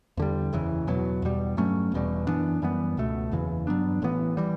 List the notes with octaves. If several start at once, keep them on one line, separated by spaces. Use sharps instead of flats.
E2 D3 G3
F#1 E2 C#3 E3
E2 B2 F#3
E2 B2 G3
G2 F#3 A3 C#4
E1 E2 B2 G3
F#2 E3 B3 D4
F#2 E3 G3 B3
C#2 B2 A3
F#1 E2 C#3 E3
G2 F#3 B3 D4
A1 A2 E3 B3
E3 G3